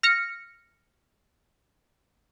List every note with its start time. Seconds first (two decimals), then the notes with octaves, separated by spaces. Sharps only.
0.03 F6 A#6 C#7